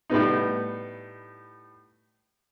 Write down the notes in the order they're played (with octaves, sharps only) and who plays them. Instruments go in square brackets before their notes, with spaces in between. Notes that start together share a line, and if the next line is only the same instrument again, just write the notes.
[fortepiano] A2 G3 B3 D#4